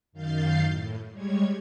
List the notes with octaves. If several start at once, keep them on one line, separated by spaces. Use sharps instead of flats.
F#2 D#3 F5 G6 A6 C7
A2
G3 G#3 C#5 G#6